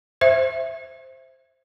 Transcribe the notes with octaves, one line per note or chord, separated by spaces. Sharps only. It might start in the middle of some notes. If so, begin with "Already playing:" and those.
C5 E5